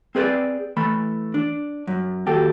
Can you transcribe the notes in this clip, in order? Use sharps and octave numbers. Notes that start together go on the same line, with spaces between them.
C4 G#4 B4 C#5 D5
E3 A3 B5
D4
F#2
D#2 F#4 G4 A4